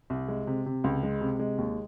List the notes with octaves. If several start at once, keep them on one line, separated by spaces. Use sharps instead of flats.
C2
G#3
C3
C3
C#2
G#3
C3
G#3
D#2